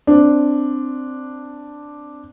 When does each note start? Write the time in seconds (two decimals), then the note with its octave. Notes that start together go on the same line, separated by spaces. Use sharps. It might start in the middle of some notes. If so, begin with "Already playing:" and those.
0.07 C4 D4